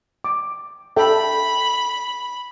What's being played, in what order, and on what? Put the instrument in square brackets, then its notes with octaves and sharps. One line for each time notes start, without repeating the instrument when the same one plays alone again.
[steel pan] D6
[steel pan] A4 E5 G5 [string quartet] B5